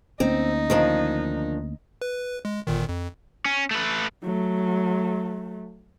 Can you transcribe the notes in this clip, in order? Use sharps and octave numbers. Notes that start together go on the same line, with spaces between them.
D2 A#3 C4 C#4 D#4
D#3 F3 D4
B4
G#3
G1 A#2 D#3
F2
C#4
A3 B4
F#3 A3